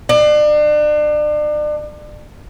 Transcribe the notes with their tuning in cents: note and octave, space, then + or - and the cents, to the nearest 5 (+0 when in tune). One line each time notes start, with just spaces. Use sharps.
D4 +35